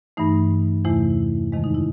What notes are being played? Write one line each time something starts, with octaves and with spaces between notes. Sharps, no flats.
G2 E3 A3 D#4
E2 C3 E3 A3 E4
F2 C3 D#3 G#3
D#4
E4